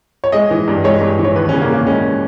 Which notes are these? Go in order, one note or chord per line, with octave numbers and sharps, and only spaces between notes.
C#5
G#3 D#5
E3
G2
G#3 C#5
G2
E3
C#5
D#2 B4
C#3 C#4
A#3
C#3
A#3
G#3 C#4